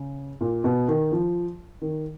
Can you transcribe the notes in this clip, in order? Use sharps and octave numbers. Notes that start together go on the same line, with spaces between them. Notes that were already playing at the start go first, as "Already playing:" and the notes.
Already playing: C#3
A#2
B2
D#3
F3
D#3